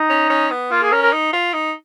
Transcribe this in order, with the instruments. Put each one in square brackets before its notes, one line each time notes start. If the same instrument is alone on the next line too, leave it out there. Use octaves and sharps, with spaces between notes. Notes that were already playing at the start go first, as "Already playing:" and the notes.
Already playing: [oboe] D#4
[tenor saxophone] C#4
C#4
B3
[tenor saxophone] A#3 [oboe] F4
[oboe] G#4
[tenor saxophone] C#4 [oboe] A#4
[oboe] A#4
[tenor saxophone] D#4
F4
D#4